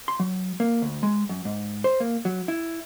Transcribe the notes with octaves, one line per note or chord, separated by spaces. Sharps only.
C6
F#3
A#3
D2
G#3
F#2
G#2
C5
A#3
F#3
E4